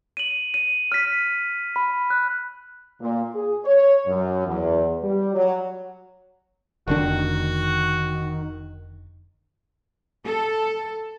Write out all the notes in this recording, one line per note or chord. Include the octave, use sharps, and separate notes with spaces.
D#7 F#7
D#7
F6 B6
B5
F#6
A#2
G#4
C#5
F#2
E2
G3
F#3
F1 D3 D#3 D4 F#4
A4